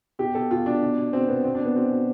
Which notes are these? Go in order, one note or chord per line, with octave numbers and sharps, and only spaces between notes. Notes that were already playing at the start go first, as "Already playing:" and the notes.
B2 G4
B2 A4
B2 F4
B2 D4
B2
B2
B2 C4
B2 B3
B2 C4
D4
B2 B3
B2 C4
B2